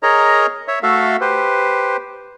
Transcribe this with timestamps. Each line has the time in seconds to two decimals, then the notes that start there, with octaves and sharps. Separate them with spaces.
0.03 G#4 A#4 C#5 D#5 A#5
0.68 C#5 E5
0.83 A3 F#4 A4 E5 F5
1.21 G4 B4 C5